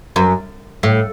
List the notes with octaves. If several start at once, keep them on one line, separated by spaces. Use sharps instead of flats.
F#2
A2